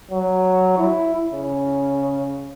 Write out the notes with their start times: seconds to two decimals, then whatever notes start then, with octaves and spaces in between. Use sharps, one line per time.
0.11 F#3
0.78 E4
1.32 C#3